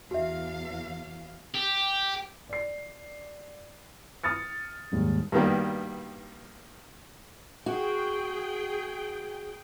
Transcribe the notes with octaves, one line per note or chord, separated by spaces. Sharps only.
E2 F#4 E5 F5
G4
D5 C7
D#6 F6 A6 C#7
D#2 G#2 G3
G2 B2 D#3 G3 A#3
F#4 G#4 G5